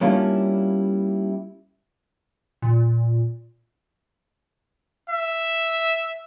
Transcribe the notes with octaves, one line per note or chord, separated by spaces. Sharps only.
G3 A#3 C#4 D4 E4 F4
A#2
E5